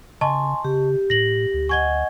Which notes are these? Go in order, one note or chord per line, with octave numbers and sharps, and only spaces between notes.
C#3 D#5 G#5 A5 C6 C#6
C#3 G4
A2 A#6 F#7
D2
D#5 F#5 G#5 C#6 G#6 G7